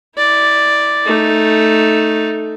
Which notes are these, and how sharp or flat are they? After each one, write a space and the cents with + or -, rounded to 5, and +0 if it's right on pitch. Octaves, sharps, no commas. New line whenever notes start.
E4 -15 D5 +0
A3 +0 D#4 +0